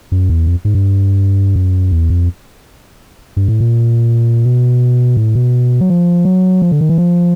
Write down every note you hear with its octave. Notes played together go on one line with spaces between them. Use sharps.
F#2
E2
F2
G#2
G2
F#2
E2
F2
G2
A2
A#2
B2
A2
B2
F#3
F3
F#3
F3
D3
D#3
E3
F3